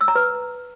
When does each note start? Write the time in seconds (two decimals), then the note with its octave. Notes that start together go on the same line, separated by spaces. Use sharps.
0.01 E6
0.08 A#5
0.15 B4